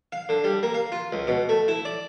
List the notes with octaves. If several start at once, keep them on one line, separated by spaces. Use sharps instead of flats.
F5
D3
G3
A#3
F5
F4
C#2
B2
A3
E4
D5